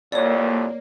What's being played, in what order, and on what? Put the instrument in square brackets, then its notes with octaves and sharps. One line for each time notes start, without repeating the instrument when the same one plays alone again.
[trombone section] C2 F2 [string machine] A#3 [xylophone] C#5 D5